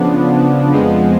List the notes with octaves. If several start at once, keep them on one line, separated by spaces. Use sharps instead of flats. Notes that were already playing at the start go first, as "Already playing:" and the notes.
Already playing: C#3 F3 B3 D4
F2 F3 G#3 B3